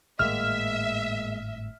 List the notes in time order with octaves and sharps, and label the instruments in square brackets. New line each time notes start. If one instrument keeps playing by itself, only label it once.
[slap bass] G#1 A2 G3 [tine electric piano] G#3 A#3 [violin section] E5 [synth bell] F6